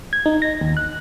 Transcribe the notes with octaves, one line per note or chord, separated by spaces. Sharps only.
G#6
D#4
A#6
D#2
F#6